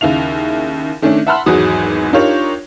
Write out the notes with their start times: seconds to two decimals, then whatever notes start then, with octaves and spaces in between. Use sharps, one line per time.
0.01 D#2 C#3 E4 F5 F7
1.02 D#3 A3 C#4 D4
1.27 E5 F#5 A5 B5 C6 F6
1.46 G#1 E2 G#2 F#3 F#4 D#6
2.13 D4 D#4 F4 G4 A#4 C#5